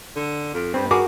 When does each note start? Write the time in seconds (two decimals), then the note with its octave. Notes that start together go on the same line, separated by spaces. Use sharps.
0.16 D3
0.54 F2
0.74 G2 C4
0.91 F#4 G#4 A#4 D6